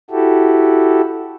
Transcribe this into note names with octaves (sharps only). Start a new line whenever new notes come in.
E4 F#4 G4 A4